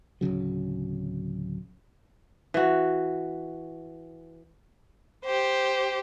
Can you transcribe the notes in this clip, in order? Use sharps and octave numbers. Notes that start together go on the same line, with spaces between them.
D1 D#2 C#3 F#3
E3 F#4
G4 C5